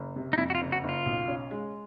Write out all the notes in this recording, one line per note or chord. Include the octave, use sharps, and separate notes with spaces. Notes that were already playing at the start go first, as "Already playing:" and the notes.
Already playing: F#1
C3
D#4
F2 E4
F#4
F4
F#1
F#4
F#1 F4
B1
C#4
G#3